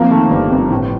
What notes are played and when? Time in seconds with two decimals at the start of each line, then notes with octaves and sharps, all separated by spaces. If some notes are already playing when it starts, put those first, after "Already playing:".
Already playing: F2 A#3
0.11 D#3 A3
0.30 G1 G3
0.51 G1
0.70 A2